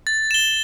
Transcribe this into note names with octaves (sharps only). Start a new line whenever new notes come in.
A6
E7 G7